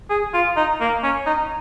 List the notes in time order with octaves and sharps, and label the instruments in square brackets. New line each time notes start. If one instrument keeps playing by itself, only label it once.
[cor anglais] G#4
F4
D#4
A#3
C#4
D#4